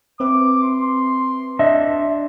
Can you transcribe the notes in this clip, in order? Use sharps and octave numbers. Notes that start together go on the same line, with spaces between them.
C4 B4 E5 D6
C6
D4 D#5 E5